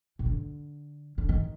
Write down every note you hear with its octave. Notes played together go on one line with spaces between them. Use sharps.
B2
D3
D3
D#3